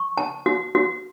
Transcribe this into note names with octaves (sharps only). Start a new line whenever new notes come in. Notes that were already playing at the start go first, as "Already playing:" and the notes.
Already playing: C#6
A5
F#4
F#4